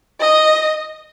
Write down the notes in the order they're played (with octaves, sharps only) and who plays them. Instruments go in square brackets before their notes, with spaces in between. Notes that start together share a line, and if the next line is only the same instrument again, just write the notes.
[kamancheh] D#5